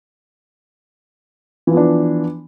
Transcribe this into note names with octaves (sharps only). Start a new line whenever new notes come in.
E3 F3 B3 D4